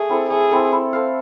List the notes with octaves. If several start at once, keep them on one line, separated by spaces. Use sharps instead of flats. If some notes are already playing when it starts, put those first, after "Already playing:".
Already playing: A3 G#4
C4 E4 A4
A3 G#4
C4 E4 A4
E4
A4 C5 F5